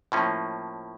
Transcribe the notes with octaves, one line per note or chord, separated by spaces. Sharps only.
A2 F3 A#3 C#4